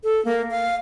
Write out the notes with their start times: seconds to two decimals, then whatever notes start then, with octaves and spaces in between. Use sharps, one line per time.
0.04 A4
0.25 A#3
0.51 F5